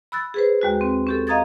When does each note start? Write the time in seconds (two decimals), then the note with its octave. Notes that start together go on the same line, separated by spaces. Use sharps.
0.12 B5 E6 F#6 A6
0.34 G#4 B4 C5
0.61 D#2 G#3 F#4
0.81 C4
1.07 C#4 G4 A4
1.27 D#5 F5 A#5 D#6 G#6 A6